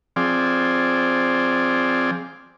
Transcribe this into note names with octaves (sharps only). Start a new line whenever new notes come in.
F3 C4 G#4 D5